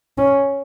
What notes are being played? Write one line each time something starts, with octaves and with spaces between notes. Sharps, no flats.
C#4